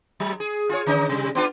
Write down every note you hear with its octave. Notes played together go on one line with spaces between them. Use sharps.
F#3
G#4
F4 G#4 C#5
D3 C#4 D#4
C3 G3
B3 D4 F4